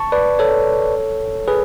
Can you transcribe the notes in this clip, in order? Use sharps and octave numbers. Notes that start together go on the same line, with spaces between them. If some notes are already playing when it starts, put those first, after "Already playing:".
Already playing: A5 C#6
B4 D5
A4 C#5
G#4 B4